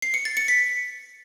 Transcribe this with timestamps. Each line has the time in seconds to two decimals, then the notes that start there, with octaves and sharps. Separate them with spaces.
0.02 C7
0.14 C#7
0.25 A6
0.37 C#7
0.48 B6